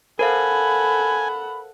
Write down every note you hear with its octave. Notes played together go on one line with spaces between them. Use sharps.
A4 A#4 C5 F5 F#5 G#5 B5